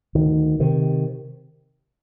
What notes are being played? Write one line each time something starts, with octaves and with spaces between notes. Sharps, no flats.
D2 D#3
C3 D#3